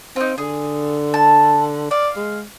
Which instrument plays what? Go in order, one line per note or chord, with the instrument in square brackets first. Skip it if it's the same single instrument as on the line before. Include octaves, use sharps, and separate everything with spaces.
[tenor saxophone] C4 [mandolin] D#4 F4
[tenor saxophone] D3 [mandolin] G#4
[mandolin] A5
[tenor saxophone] D5 [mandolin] F5
[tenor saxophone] G#3